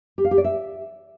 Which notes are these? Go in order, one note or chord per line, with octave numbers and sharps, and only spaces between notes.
G4
F5
G4
D5
E5